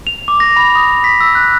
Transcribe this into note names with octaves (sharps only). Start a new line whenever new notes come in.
F7
D6
A#6
B5
D#6
B6
E6
F#6